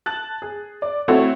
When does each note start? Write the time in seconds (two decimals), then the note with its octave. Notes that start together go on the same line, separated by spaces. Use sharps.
0.06 A5 F#6 A6
0.42 G#4
0.82 D5
1.08 A3 C4 E4 F#4 A4 C#5